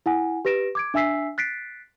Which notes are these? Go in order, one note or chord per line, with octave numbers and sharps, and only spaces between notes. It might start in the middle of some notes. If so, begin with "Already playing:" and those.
E4 F#5 G#5
G4 B4 A#6 D7 E7
D6 G#6 D7
D4 E5 G#5 E6 B6 C7
F#6 A6 B6 C7 D7